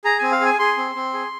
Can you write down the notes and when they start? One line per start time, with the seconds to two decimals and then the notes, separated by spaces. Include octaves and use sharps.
0.05 G#4 A#5
0.18 C4 G#5
0.32 F5
0.41 G#4 G#5
0.59 G#4 C6
0.77 C4
0.95 C4
1.13 G#4